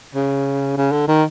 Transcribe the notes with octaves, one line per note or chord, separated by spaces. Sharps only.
C#3
C#3
D3
D#3